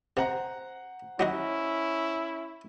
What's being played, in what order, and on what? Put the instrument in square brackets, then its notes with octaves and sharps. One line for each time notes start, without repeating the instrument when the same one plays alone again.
[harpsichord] C3 [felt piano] C5 F#5 A#5
[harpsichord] F#3 D#4 F#4 [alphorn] C#4 [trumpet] E4